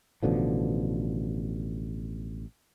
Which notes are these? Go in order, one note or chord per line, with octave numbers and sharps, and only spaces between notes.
A1 B2 D3 F3